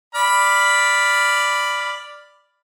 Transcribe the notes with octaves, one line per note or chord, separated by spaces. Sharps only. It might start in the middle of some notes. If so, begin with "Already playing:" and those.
D5 B5 F6